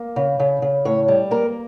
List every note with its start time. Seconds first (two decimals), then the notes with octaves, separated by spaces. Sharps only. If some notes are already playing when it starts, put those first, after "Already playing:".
Already playing: A#3
0.16 C#3
0.40 C#3
0.62 C#3
0.85 A2 C#5
1.08 G3
1.31 A#3 A#4